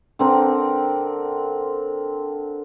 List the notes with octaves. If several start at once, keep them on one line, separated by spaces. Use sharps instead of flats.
D3 C4 A#4